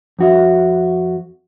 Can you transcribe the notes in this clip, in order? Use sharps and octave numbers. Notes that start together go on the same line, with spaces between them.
F2 F#4 E5